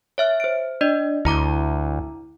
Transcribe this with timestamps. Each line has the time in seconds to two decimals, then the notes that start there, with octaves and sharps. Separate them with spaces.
0.18 C#5 E5 F6
0.40 C5 D7
0.81 D4 D5 D#5
1.25 D2 E4 A#5 D6